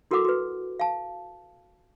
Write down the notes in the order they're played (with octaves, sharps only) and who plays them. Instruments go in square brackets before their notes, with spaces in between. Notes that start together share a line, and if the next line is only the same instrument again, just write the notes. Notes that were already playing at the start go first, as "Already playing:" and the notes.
[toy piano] E4 F#4 A4 A#4 F#5 D6
F#4 B4
F5 A5